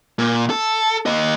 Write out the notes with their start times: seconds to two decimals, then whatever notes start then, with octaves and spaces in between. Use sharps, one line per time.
0.19 A#2
0.50 A4
1.06 A#3 D#5